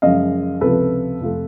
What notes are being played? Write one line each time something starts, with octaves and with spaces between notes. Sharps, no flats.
F#2 C#3 F3 G#3 D#5 F5
C#2 C3 F3 A4 B4
F2 C3 F3 A3